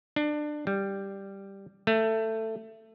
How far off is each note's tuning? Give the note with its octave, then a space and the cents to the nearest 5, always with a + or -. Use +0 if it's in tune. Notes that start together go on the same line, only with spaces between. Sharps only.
D4 +25
G3 +0
A3 +15